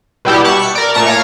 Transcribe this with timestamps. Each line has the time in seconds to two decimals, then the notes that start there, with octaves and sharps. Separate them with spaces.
0.25 B2 G3 E4 G4
0.44 F#5 A5 C#6
0.57 B6 C#7
0.75 A#4 D5
0.94 A#2 A3 A#5 C#6 E7
1.07 C#5 F5 A#6 C#7